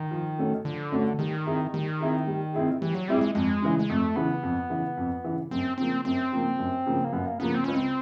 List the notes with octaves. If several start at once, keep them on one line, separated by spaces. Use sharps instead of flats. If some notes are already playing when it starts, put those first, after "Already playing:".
Already playing: D#3
F3
A3 C#4 F#4 A4
D3 F3
A3 C#4 F#4 A4
D#3 G3
C4 E4 G#4
D#3 G3
C4 E4 G#4
G3
C4 E4 G#4
E3 G3
F#3
G3 C4 E4 G#4
G#3
F2 G#3
C#3 E3
G#3
F2 A3
C#3 E3 B3
F2
C#3 E3
F2
C#3 E3
F#2 C4
C#3 F3 A#3 C4
F#2 C4
C#3 F3 A#3
F#2
C#3 F3 A#3
A#3
F#2 B3
A#3
C#3 F3 A#3 B3
C4
C#2 C#4
C4